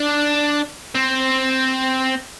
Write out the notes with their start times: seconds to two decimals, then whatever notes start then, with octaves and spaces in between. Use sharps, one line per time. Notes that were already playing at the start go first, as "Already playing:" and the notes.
Already playing: D4
0.95 C4